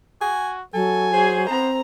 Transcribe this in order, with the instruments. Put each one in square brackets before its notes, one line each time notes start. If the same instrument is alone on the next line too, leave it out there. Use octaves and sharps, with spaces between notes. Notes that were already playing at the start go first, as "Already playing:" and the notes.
[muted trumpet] F#4 [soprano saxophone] G#5
[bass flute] F#3 [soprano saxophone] A4 [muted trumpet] G#5
[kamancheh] G#4 [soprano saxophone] C5
[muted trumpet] B3 [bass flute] C4 [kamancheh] A#5